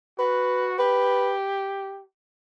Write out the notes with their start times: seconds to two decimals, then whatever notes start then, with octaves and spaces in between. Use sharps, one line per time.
0.18 F#4 B4
0.79 G4 B4